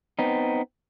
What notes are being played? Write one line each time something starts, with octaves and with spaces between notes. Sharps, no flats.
B3 C4 D#4